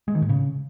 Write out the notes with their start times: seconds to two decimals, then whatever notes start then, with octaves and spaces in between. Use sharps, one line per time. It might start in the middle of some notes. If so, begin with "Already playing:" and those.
0.08 G#3
0.15 D#3
0.22 A2
0.29 C#3